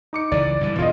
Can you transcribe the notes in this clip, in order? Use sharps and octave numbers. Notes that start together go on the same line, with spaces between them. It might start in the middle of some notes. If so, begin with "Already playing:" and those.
D#4 D6 C#7
C#2 E3 D5
G2 D3 E3
E1 B2 D3 F4 D#5